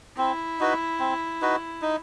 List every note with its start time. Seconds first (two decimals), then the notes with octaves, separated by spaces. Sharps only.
0.18 C4 E4
0.60 D#4 F#4 B4
1.00 C4
1.42 D#4 F#4 B4
1.82 D#4